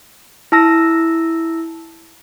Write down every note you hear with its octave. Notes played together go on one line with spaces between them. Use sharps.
E4 A5 E6 A#6